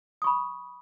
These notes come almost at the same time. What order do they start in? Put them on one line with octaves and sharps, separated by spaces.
D#6 C#6 B5